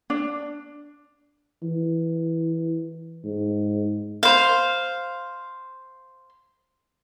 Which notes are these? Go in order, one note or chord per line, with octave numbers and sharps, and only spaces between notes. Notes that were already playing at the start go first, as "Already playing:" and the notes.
D4
E3
G#2
C5 F5